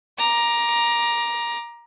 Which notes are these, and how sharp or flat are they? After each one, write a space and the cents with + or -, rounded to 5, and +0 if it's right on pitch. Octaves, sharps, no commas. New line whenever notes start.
A#5 +15 D6 +15